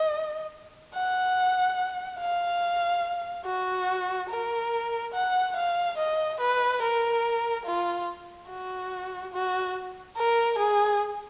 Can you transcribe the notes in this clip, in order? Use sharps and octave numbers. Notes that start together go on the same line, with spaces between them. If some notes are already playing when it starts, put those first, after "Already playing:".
Already playing: D#5
F#5
F5
F#4
A#4
F#5
F5
D#5
B4
A#4
F4
F#4
F#4
A#4
G#4